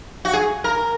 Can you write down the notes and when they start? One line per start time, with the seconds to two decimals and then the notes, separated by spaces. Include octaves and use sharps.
0.25 F#4
0.33 G#4
0.64 A#4